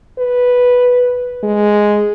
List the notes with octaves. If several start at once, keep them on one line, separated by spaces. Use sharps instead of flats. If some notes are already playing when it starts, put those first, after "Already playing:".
B4
G#3